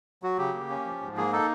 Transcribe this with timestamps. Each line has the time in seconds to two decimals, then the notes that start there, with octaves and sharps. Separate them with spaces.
0.23 F#3 F#4
0.38 C#3 G4
0.54 A#3
0.70 C#4
0.85 F3
1.01 G#2
1.17 A#3 G#4
1.33 D#4 A4